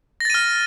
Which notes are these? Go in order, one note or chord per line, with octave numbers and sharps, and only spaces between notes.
F6 A6 A#6 D#7